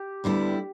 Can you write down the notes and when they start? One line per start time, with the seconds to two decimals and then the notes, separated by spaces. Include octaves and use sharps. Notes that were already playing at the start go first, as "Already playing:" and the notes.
Already playing: G4
0.24 D2 D3 G3 B3 E4